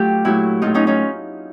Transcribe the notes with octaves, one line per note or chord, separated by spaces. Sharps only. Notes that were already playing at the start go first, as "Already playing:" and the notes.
Already playing: F#3 A3 F4 G4
A#2 F#3 A3 E4 F#4
A2 F#3 A3 D#4 F4
C#4 D#4
C#4 D#4